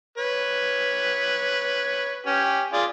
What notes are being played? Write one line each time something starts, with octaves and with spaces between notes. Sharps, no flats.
B4 C#5
C#4 G4
F4 G#4 D5